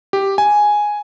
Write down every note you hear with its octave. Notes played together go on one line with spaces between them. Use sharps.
G4
G#5